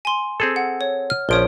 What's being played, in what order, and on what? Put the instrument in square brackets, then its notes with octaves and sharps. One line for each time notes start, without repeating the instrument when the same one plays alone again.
[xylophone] G#5 C6
[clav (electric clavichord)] C4 G#4 A4
[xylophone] F#5
C#5
F6
[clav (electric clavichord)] A#1 F3 C#4 [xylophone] C#5 D7 G7